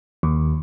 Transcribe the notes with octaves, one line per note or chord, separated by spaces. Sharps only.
D#2